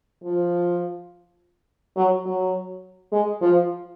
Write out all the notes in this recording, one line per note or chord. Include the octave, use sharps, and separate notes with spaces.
F3
F#3
F#3
G#3
F3